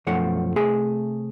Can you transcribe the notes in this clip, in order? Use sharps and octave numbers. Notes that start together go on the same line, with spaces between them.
B1 F#2 F3 A3 F#5
C3 A3 G#4 E5 G#5